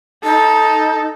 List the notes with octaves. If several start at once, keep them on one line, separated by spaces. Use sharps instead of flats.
D#4 A4